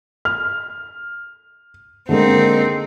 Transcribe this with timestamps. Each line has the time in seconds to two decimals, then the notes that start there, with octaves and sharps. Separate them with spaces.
0.25 F6
2.09 D3 G#3 A#3 C4 D#4